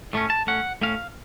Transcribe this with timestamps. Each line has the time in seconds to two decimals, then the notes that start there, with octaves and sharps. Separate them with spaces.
0.13 A2 A3 C#4
0.30 A5
0.47 A2 A3 C#4 F#5
0.81 A2 A3 C#4 F5